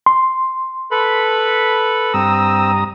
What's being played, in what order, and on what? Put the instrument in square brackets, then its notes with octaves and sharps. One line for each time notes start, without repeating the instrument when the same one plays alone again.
[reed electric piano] C6
[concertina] A4 B4 B5
[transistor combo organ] G2 A#5 D#6 [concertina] C4 E6